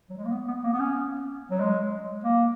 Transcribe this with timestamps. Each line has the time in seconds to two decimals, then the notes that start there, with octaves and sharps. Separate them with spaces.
0.10 F#3
0.17 G#3
0.25 A#3
0.32 B3
0.48 B3
0.64 A#3
0.73 B3
0.80 C#4
1.51 F#3
1.60 G#3
2.24 A#3